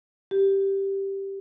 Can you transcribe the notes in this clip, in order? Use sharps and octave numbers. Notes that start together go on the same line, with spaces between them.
G4